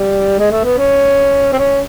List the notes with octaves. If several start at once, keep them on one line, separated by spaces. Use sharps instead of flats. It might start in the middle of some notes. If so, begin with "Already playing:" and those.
Already playing: G3
G#3
A3
B3
C#4
C4
C#4